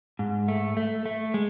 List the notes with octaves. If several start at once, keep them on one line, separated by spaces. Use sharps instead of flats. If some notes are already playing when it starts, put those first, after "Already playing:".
G#2
A3
A3
A3
G#3